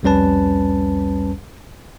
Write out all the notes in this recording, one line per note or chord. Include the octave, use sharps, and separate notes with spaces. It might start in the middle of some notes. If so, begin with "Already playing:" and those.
C2 F2 G3 C#4 B4 A5